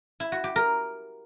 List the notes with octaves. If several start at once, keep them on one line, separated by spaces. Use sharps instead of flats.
E4
F#4
G4
A#4